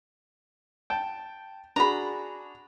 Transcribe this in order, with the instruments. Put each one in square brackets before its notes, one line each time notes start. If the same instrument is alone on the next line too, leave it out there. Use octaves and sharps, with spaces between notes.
[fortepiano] G5 A5
[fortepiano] D4 F#4 G#4 [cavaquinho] A#5 B5